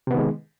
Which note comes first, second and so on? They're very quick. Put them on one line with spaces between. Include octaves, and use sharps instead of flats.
C3 B3 D#3 G#3